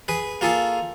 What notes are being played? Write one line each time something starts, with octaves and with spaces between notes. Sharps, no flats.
G#4 B4
A#3 F4 G#4 A4